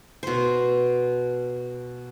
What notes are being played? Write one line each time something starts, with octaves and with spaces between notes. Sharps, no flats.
B2 C5